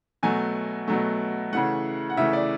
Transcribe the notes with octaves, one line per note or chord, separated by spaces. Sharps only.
B2 F#3 A3 G#5
B2 F#3 A3
C#3 E3 A3 F#5
F#5
C#3 E3 A3 E5
D5